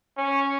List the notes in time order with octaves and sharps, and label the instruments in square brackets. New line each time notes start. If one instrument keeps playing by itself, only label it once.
[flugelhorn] C#4